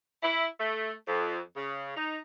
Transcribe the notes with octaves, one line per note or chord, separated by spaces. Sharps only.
E4
A3
F2
C#3
D#4